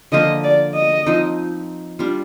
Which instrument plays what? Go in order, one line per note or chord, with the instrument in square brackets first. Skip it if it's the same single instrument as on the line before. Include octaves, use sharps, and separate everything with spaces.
[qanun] D3 F3 A#3 F4 [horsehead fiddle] D#5
[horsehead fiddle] D5
D#5
[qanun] F3 C4 D#4
G3 D4 F4